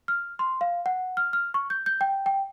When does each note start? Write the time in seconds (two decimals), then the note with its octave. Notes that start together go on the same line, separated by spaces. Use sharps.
0.08 F6
0.39 C6
0.61 F5
0.86 F#5
1.17 F6
1.33 F6
1.54 C#6
1.70 G6
1.86 G6
2.01 G5
2.26 G5